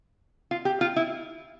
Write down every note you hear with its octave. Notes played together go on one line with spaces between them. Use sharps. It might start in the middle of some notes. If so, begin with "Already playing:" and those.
F4
G4
F4
E4